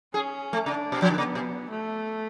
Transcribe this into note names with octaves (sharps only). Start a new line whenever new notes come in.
C#4 G#4
A3
C#3 D4
B2
F3
D3
C#3 B3
B2
A3